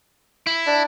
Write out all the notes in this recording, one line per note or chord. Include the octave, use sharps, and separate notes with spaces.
E4
D4